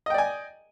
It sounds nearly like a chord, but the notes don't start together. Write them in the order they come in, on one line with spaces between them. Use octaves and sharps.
D#5 G5 D5 G#5